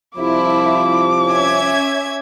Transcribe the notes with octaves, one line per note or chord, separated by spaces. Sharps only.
C2 F3 E4 E5 D6
C#4 E5 G#6